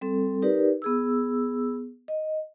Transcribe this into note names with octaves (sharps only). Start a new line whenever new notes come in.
G3 C4 A4
D#4 G4 A#4 B4 D5
B3 G#4 E6
D#5